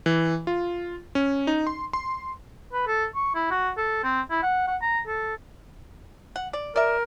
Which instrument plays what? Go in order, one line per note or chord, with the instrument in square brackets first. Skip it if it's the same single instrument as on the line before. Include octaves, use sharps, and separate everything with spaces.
[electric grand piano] E3
F4
C#4
D#4
C6
C6
[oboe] B4
A4
C#6
E4
F#4
A4
C4
E4
F#5
F#5
A#5
A4
[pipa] F#5
D5
[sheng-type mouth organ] A#4 [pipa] D5 E5